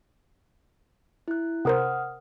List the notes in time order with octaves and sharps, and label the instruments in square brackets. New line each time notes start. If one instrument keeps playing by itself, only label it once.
[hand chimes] E4 F#6
[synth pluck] C3 A#4 C5 [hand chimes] F#5 D#6 F6